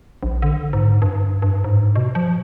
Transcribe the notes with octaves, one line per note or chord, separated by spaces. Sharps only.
A#1
D3
G#2
G2
G2
G#2
B2
F3